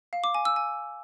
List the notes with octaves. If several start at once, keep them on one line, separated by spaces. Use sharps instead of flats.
F5
D6
G#5
E6
G#5